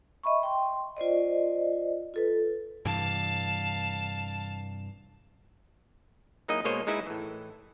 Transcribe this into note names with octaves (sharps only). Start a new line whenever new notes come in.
D#5 E5 B5 C#6
G5 C6
F4 C5 D5 D#5
F4 A4 B4
G2 C3 E3 F5 A5
F#3 A#3 D#4 E4 G#4 D#5
B2 G#3 A#3 C5 C#5 D#5
G#3 D#4 E4 B4 E5
A2 E3